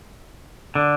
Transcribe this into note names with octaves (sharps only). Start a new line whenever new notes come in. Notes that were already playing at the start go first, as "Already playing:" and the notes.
D3